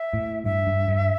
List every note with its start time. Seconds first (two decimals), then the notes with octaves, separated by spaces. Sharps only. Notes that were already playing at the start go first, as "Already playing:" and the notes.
Already playing: E5
0.13 A2
0.45 G2 E5
0.67 G2
0.88 G2